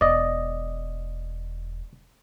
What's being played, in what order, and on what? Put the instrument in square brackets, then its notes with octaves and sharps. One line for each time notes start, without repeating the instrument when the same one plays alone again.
[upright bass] E1 [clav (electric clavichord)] D5 D#5